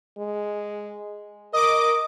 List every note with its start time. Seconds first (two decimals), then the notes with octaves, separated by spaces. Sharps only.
0.18 G#3
1.53 A#4 D#5 D6 D#6